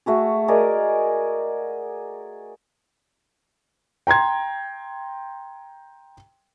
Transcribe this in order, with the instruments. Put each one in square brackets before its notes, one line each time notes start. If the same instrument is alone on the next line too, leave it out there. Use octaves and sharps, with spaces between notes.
[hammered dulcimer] A3 F#4 G#4
G#4 A#4 D5 D#5
[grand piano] G5 A#5 C6 G#6